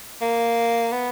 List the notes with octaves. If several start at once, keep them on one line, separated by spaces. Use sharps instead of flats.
A#3
B3